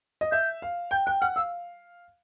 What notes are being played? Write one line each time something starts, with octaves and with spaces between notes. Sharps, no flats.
D#5
E5 G6
F5
G5 G6
G5 F#6
F#5 F6
F5 E6